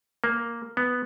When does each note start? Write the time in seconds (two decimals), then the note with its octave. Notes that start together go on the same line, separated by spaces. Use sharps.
0.24 A#3
0.77 B3